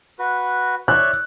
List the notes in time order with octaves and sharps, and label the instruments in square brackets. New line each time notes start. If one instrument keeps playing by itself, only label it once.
[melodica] F#4 B4
[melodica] C#5 D5 E5 [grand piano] F#6